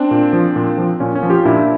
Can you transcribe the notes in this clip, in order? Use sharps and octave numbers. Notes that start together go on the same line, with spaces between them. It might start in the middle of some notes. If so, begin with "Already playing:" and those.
Already playing: C4 D4
A#2
F3
A#2
F3
A#2 C#4
C#4
F3
F4 G4
A#2 D4 E4